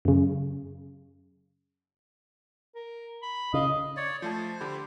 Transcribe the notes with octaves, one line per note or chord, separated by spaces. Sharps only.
F#2 C#3
A#4
B5
C#3 D#5 F5
C#5 D5
F3 A3 C5 A5
D3 G4 B5